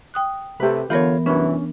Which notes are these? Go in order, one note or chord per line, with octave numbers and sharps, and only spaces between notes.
G5 D#6 F#6
C3 A3 G4 B4
D3 E3 B3 F4 A#4 C#5
C2 F#2 E3 C#4 D4